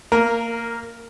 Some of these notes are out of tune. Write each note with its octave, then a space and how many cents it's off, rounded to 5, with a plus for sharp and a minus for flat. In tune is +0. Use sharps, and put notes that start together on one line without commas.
A#3 -20 A#4 +0